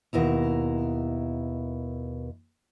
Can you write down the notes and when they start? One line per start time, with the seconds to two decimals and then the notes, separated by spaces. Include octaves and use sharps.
0.13 D#2 B2 E4 A#5